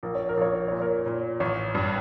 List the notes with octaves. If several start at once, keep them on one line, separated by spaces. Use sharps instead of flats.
A#1 A#4
C#5
A#4
A#1 C#5
A#4
A#2 C#5
A#4
A#2
A1 C#5
G2